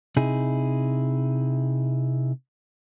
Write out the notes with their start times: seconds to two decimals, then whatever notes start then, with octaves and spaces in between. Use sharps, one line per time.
0.16 C3 D#4 E4 G#4